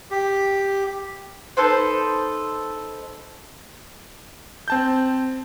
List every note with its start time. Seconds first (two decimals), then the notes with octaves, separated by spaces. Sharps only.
0.11 G4
1.57 D#4 A4 B4 C5
4.68 C4 A5 G6